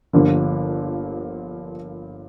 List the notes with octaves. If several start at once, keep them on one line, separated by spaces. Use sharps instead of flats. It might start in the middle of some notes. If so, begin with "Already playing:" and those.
G1 G2 D3 F3 A#3